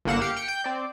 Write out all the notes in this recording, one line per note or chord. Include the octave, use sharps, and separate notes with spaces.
G1 D3 A#3 F#5 E7
G4 F5 C#7
G5 C#7
G5 G6
C4 D5